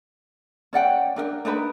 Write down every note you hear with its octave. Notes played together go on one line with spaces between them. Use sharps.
C#4 D5 F#5 G5
D4 A#4 D#5 G5
D4 D#4 A#4 B4